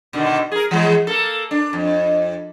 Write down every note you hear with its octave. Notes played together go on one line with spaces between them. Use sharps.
B2 D3 D#3
G#4 A#4
E3 G#3 G#4
A#3 A4
D4
F2